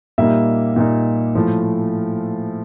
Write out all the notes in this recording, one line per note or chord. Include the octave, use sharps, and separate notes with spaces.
A#2 G3 A#3 D#4 E5
A#2 G3 A#3 D#4
A2 F3 A3